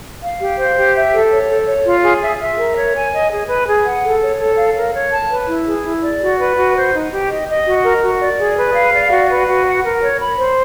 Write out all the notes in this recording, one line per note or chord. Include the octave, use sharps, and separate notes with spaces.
F5
G4
C5
G4
E5
A4
C#5
A4
C#5
F4
G#4
E5
E5
A#4
C#5
G#5
D#5
G#4
B4
G#4
F#5
A4
C#5
A4
F5
A#4
C#5
A5
B4
E4
G#4
E4
D5
F#4
B4
F#4
C5
D#4
G4
D#5
D#5
F#4
A#4
F#4
D5
G#4
B4
F5
D5
F#4
B4
F#4
F#5
A#4
C#5
B5
C5